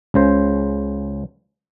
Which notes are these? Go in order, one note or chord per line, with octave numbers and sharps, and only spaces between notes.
C#2 C#3 C5